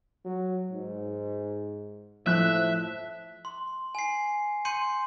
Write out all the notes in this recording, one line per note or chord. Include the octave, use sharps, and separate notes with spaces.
F#3
G#2
A2 F3 E5 F#6
C6
G#5 C7
C6 G6 C#7 D#7